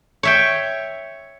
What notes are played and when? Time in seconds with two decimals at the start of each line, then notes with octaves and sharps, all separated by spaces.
0.23 C#5 E5 G5